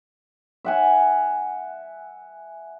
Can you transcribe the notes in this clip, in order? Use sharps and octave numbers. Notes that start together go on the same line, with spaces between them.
E5 F#5 G#5